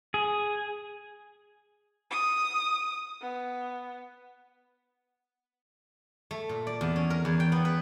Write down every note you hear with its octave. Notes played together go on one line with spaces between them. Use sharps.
G#4
D#6
B3
A3
A#2
D5
E2
C#4
A#4
E2
G5
B3
B4